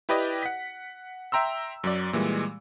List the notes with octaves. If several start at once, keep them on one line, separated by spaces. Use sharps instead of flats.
E4 G4 B4 D5 D#5
F#5 B6
E5 G5 A#5 C6 E6
F#2 F#3 D5
A#2 E3 G3 G#3